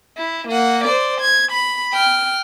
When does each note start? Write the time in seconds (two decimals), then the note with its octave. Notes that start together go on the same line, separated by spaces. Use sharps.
0.17 E4
0.48 A#3 F#5
0.84 C5 D5
1.21 G#6
1.52 B5
1.93 G5 F6